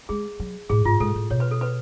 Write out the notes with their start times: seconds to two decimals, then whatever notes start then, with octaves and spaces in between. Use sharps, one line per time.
0.09 G#3 G#4
0.40 F#3
0.70 A2 G#4
0.85 G#2 F4
1.00 G#2 A4
1.15 A2
1.30 B2 C#5
1.40 B4
1.51 A4
1.61 B4